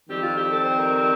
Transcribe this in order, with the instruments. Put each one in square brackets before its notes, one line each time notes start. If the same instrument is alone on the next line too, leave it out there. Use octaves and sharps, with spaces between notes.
[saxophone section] F2 D#3 G3 C4 G4
F4
G4
A4
C5
A#4